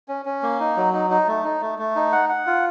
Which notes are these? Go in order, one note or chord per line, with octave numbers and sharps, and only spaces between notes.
C#4
C#4
A#3
D#4
F#3
D#4
D#4
A3
D#4
A3
A3
D#4
F#5
F#5
F4